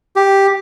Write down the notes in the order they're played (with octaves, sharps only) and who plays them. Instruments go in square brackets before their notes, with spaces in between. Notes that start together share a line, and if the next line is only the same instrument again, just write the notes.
[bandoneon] G4